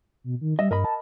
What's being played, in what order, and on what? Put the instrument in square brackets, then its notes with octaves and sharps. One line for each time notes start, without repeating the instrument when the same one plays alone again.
[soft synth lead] B2
D#3
[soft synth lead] G3 [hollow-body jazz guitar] D#5 E5
[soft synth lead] G2 [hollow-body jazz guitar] A#4 D#5 B5
[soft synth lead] A5